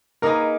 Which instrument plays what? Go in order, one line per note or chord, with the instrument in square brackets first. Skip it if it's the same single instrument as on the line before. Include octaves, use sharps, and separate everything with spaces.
[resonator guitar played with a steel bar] A#3 D#4 G#4 B4 D#5 [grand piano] A#4